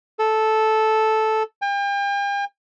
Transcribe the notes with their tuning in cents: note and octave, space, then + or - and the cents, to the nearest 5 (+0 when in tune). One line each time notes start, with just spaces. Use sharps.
A4 -10
G5 +40